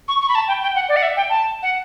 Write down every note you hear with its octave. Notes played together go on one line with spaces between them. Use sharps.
C#6
C#6
B5
A5
G5
G5
F#5
D5
F#5
E5
G5
A5
F#5